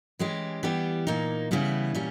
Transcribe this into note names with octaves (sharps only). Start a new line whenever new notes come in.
E3 G#3 C#4 G4
E3 G3 B3 G4
A#2 A#3 D#4
C#3 E3 G3 B3 E4
A#2 G3 C#4